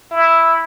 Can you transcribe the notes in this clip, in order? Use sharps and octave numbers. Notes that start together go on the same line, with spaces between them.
E4